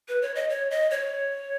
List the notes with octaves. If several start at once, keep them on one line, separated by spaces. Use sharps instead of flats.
B4
C#5
D#5
C#5
D#5
C#5